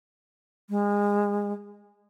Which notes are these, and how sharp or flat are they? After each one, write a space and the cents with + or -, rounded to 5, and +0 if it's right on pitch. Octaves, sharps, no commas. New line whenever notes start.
G#3 -25